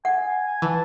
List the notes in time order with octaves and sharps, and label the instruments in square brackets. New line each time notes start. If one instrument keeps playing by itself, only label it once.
[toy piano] F#5 [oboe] G#5
[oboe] G#5
[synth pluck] E3 [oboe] A5